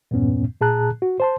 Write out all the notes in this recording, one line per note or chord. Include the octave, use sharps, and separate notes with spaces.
E2 G2 A#2 B3 C#4
A#2 G#4 A5 A#5 F#6
F#4
C5 A5 C6